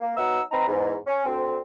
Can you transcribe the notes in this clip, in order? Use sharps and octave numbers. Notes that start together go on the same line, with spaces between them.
A#3
F#3 B3 D#4 F#5 E6
C4 D#4 B4 A#5
E2 G#2
C#4
D2 C4